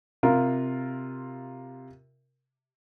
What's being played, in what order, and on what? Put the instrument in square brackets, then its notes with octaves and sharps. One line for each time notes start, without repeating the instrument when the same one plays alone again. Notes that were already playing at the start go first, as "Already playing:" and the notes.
[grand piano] C3 F4 A#4